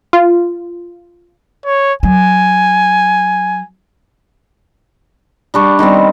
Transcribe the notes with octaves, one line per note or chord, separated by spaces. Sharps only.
F4
C#5
F#3 G#5
G3 D4 C#6
D#3 G3 B3 C4